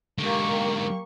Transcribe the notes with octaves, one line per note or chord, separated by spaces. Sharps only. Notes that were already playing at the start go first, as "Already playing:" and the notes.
G#2 D3 A#3 G4 C#6